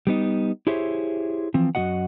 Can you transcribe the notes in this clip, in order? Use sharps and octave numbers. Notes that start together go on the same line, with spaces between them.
G3 B3 D#4
E4 G4 G#4 C5 C#5 E5
E3 F3 C4
F#2 G#3 F#4 D#5 F#5